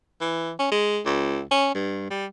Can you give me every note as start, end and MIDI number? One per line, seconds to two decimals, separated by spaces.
0.21 0.51 52
0.59 0.69 61
0.72 1.00 56
1.05 1.41 37
1.51 1.72 61
1.75 2.09 43
2.10 2.26 55